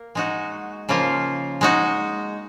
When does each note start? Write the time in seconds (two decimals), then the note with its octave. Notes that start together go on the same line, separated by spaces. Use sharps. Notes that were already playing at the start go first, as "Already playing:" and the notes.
Already playing: A#3 A#4
0.15 G#3 D#4 F#4
0.89 C#3 F3 A#3 F4
1.61 G#3 D#4 F#4